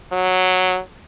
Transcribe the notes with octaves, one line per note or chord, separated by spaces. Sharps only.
F#3